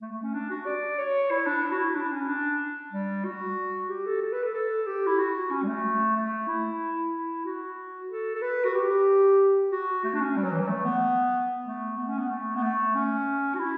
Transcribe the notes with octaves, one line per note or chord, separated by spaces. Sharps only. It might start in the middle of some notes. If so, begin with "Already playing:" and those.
A3
A3
C#4
D4
F#4
D5
C#5
E4
D4
E4
F#4
E4
D4
C#4
D4
G3
F#4
G4
A4
A4
B4
A4
A4
G4
E4
F#4
C#4
G3
A3
A3
E4
E4
F#4
A4
A4
B4
F#4
G4
F#4
A3
D4
C#4
G3
F#3
E3
F#3
A3
B3
A3
B3
C#4
B3
A3
B3
A3
C#4
F#4
E4